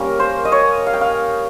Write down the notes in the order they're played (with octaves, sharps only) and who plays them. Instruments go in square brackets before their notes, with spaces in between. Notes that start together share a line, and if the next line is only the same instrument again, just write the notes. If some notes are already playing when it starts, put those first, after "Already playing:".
Already playing: [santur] G3 A#3 C#4 A#4
C5
D#5
C#5
F5
G5
F5